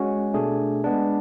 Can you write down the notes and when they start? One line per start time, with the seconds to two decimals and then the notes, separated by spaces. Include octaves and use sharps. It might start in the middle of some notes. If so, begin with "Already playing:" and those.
Already playing: G#3 C#4 F#4
0.34 B2 A3 D4 G#4
0.84 G#3 B3 D4